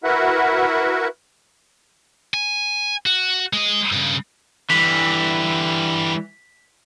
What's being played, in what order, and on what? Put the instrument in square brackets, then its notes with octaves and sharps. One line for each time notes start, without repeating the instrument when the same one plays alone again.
[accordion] E4 F#4 A#4 B4 E5 F#5
[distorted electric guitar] G#5
F#4
G#3 D#5
G2 C#3
[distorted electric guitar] D3 G3 [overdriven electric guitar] E3 [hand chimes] B6